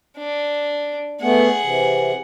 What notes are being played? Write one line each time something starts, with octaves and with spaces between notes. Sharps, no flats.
D4
A3 B3 G#4 F#5
C3 E3